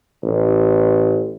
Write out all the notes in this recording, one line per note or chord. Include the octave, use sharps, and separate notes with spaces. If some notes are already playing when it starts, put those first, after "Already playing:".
A1